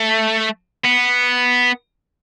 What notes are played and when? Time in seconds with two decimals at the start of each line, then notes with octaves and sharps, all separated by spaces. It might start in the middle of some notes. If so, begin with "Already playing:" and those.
Already playing: A3
0.85 B3